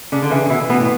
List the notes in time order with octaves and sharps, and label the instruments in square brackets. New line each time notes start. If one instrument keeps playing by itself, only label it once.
[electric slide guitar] C#3 [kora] D4
[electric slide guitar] D3
[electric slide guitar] C#3 [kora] E3
[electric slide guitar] C#3
[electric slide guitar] B2 [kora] E4
[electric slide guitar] B2 [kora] B3
[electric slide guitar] A2